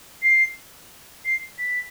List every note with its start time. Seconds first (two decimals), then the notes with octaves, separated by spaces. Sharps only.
0.22 C7
1.25 C7
1.58 B6